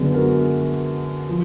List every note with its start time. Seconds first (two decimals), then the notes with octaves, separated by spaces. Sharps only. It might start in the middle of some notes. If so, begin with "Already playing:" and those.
Already playing: F#2 D3 G#3 B3
0.14 F#4 A#4
1.29 F3